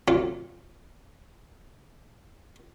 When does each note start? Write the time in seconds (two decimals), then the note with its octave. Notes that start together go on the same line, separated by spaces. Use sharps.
0.08 F#3 A3 C4 C#4 F4